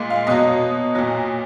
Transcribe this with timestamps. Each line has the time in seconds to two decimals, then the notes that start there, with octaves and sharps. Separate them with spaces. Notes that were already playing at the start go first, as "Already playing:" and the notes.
Already playing: A#2 G#3
0.10 F5
0.27 B2 F#3 D#5
0.95 A#2 F#3